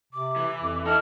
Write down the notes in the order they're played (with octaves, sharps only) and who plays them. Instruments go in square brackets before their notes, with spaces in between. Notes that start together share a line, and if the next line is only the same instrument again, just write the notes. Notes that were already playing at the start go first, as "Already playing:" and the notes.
[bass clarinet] C3 [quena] D6
[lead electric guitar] E3
[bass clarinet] F2
[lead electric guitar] D#4 E4 [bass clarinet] A4 [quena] F6